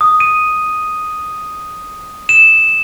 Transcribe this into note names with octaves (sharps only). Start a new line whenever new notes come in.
D#6
D#7
E7